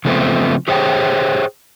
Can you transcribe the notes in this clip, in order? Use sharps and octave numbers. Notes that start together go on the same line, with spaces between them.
C#3 F3 A3 B3 C4
G4 G#4 C5 C#5 G5